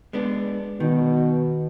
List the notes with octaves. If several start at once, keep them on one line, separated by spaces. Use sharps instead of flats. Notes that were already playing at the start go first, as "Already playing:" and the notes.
G#3 B3 D4
B2 D#3